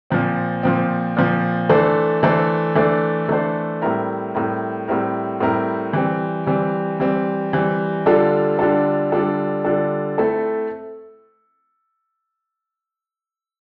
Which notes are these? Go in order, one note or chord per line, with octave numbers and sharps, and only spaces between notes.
A#2 F3 C4
A#2 F3 C4
A#2 F3 C4
E3 A3 D4 A4 C5
E3 A3 D4 A4 C5
E3 A3 D4 A4 C5
E3 A3 D4 A4 C5
A2 G3 C4 E4 A#4
A2 G3 C4 E4 A#4
A2 G3 C4 E4 A#4
A2 G3 C4 E4 A#4
E3 G3 C4
E3 G3 C4
E3 G3 C4
E3 G3 C4
D3 G3 D4 F4 A4
D3 G3 D4 F4 A4
D3 G3 D4 F4 A4
D3 G3 D4 F4 A4
A3 C4 E4 A4